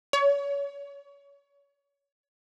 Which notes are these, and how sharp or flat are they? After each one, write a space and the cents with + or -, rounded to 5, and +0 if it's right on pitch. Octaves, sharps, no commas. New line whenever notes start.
C#5 +30